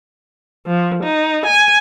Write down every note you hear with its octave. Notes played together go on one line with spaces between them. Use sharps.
F3
D#4
G#5